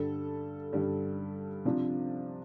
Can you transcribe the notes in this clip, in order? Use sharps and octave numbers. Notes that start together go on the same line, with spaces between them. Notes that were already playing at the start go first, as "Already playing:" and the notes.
Already playing: G2 D3 G3 A4
G2 D3 G3
C3 F3 D4